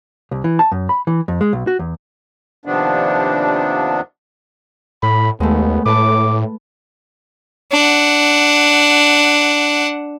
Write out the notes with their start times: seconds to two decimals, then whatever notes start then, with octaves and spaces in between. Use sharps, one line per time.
0.31 C2
0.44 E3
0.59 A5
0.72 F#2
0.89 B5
1.07 E3
1.28 F2
1.41 G#3
1.53 B1
1.67 F#4
1.79 E2
2.65 D#2 C3 F3 B3 D4
5.03 A2 B5
5.40 D#2 G#3 A3 B3
5.86 A2 B4 A5 D6
7.72 D4 F#5